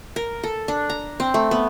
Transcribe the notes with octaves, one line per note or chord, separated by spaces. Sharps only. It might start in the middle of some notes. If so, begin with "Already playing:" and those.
A#4
A4
D4
A#5
C4
A3
B3